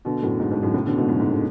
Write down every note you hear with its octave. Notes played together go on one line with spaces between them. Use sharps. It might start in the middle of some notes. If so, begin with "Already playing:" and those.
B2 D3
F#2 A2
G#2
G#2
F#2 A2
A2 C#3
B2 D3
G#2 B2
F#2 A2
G#2
B2 D3